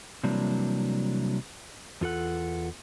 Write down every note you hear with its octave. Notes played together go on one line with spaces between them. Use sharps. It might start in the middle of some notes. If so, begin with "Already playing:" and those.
C3 E3 F#3 G3 A#3 D4
E2 F4 A4 F#5